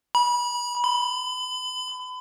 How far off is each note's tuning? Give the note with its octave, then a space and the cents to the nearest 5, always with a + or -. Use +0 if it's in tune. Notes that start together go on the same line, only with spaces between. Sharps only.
B5 -30
B5 +35